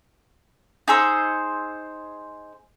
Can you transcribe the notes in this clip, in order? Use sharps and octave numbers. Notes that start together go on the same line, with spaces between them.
D#4 G#4 C5 E6